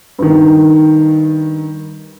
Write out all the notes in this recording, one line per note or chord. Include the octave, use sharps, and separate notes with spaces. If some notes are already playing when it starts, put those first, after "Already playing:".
G2 D#3